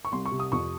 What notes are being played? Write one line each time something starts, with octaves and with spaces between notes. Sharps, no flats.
C#6
C2 C6
C#6
C3
D#6
F2 C#6